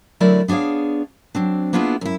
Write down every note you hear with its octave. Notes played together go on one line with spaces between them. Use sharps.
D3 F#3 A3 E4 A#4 D5
B3 D4 G#4 C#5 F5
F#3 C4 D4
A#3 B3 D4 E4 F4 G#4
F#2 E4